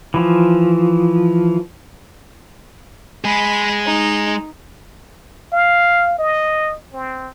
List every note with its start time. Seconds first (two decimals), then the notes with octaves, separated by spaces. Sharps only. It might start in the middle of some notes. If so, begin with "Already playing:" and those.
0.14 E3 F3
3.24 G#3 G#4 B5
3.86 D#4
5.53 F5
6.19 D#5
6.93 C4